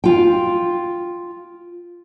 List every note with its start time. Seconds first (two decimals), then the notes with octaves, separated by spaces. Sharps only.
0.04 F4 G5